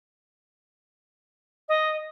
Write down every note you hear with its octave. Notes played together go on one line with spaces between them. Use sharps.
D#5